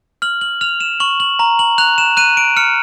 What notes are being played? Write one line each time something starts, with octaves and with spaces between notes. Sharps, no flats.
F6 F#7
F#7
F6 F7
E7
C#6 F#7
F#7
A#5
F#7
F#6 F7
E7
F#6 D#7
D7
F6 C#7